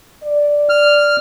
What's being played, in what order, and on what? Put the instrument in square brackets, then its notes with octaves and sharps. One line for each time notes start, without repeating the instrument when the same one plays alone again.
[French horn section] D5
[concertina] F6